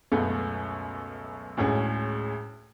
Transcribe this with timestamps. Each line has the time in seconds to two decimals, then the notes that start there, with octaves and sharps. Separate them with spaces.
0.12 C#2 F#2 B2 A3 B3
1.57 D2 A2 G#3 C#4